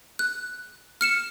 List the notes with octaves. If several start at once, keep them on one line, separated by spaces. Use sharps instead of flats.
F#6
F6 C#7 E7